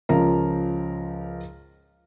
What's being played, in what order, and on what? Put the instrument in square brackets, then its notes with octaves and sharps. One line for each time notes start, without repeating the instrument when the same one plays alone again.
[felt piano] C#2 F3 C#4 A#4 A#5